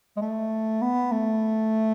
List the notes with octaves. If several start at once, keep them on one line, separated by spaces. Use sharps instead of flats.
G#3
A3
B3
A3